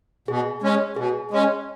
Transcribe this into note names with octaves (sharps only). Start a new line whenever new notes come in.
B2 G#4
G#3 C#4
B2 G#4
G#3 C#4